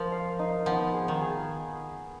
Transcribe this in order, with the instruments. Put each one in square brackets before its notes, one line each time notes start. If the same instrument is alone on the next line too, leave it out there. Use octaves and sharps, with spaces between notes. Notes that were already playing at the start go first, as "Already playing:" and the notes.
Already playing: [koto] F3 [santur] A#4
[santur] F5
D#4
[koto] F3 [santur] B3
[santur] G#4
[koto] D#3
[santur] G#4